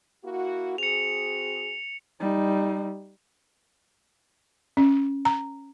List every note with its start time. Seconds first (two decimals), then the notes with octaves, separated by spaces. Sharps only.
0.25 A#3 E4 F#4
0.78 C4 F#4 G#4 C#7 F7
2.20 G3 D#4
4.77 C#4
5.25 A#5